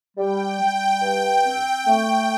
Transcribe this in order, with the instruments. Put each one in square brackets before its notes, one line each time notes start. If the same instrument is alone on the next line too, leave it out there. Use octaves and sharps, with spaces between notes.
[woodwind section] G3 [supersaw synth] G5
[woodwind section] G3
G2
C4
A3